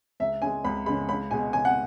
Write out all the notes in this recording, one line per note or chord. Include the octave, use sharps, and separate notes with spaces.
C#2 E5
C#3 G#3 G#5
C#2 B5
C#3 G#3 B5
C#2 B5
B2 G#3 G#5
C#2 G#5
F#5